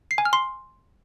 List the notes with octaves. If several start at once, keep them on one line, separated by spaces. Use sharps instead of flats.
C7
G#5
F6
C6